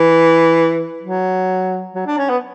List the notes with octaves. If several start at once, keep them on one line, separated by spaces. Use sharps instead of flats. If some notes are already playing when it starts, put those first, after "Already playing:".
Already playing: E3
F#3
F#3
D4
C#4
B3